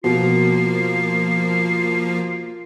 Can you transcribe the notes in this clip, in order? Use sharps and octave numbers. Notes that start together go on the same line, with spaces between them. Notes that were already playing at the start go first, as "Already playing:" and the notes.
B2 F3 A#3 F4 C7